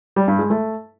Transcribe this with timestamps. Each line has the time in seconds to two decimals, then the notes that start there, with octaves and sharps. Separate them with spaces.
0.16 G3
0.28 G2
0.39 G#3
0.50 A3